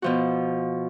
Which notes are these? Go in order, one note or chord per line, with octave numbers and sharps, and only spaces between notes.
B2 F3 F#4